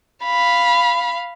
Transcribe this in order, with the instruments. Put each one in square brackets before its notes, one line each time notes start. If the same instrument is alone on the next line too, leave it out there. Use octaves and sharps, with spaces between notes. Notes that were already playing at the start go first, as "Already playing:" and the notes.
[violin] F5 B5